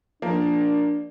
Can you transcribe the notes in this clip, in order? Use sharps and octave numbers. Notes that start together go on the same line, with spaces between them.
F3 A#3 D4